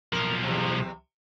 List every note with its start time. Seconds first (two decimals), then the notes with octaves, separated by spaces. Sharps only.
0.13 B1 F3 A#4
0.44 E2 C3